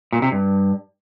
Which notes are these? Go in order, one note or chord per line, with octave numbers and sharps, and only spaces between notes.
A#2
C3
G2